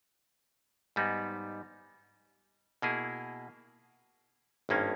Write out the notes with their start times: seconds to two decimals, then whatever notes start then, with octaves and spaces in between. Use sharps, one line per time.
0.96 G#2 G3 B3 D#4
2.82 B2 A#3 E4 G#4
4.69 G#1 G2 D#3 A#3 C#4